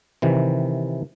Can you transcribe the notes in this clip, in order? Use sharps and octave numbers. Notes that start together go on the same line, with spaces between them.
C3 D#3 E3